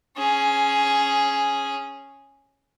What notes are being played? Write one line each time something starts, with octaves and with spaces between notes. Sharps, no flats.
C#4 G#4